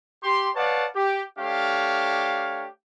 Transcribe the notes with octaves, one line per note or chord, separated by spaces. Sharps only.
G4 C6
B4 C#5 D5 F5 F#5 A5
G4
A3 D4 G4 C#5 F5